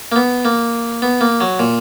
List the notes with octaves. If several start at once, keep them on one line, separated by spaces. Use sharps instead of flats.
A#3
B3
A#3
B3
A#3
F#3
A#2